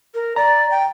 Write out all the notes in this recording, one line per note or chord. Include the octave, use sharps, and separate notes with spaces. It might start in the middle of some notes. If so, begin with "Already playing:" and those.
A#4
D5 A#5
G5